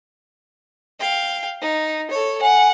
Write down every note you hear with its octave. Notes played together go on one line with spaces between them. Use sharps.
F5 G5
D#4
A4 C#5
F#5 G#5